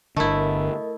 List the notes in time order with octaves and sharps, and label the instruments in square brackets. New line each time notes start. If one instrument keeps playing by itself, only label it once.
[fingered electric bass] G1 D3 [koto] A3 E4 [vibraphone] A#4 [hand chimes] D#5